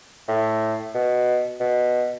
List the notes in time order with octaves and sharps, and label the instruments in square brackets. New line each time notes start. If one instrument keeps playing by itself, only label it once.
[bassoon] A2
B2
B2